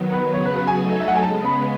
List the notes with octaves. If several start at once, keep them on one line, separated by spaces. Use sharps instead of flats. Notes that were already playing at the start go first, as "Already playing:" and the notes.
Already playing: D#3 F#3 B3
B4
C#3 F#3 B3 F#4 C#5
B4
B4
G#5
F#3 A3 D#4 A4
E5
F#5
G#5
C#3 G#3 B3 A5
B5